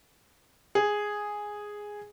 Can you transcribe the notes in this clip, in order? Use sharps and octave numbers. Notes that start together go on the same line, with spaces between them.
G#4